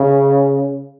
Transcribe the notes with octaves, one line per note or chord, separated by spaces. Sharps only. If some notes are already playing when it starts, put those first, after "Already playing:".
Already playing: C#3